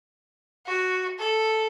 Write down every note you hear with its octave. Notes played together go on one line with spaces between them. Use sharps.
F#4
A4